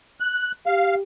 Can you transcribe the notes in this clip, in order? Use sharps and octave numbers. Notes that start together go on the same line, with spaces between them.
F#6
G4 F5